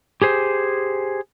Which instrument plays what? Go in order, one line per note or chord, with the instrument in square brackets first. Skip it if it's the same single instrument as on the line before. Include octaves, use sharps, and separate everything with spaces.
[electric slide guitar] G4 G#4 C5